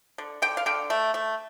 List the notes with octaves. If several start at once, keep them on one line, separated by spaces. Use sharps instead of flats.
D3
D3 G5
F5
D3 G5
A3
A3